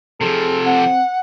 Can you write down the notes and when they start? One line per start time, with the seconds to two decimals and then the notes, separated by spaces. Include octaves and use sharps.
0.21 C3 F3 G#4 A4
0.65 C4 F#5